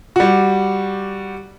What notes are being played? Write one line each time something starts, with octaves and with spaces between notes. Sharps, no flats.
G3 F#4